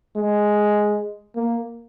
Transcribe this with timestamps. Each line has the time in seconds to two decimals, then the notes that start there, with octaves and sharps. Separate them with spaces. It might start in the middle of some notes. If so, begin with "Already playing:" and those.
0.16 G#3
1.36 A#3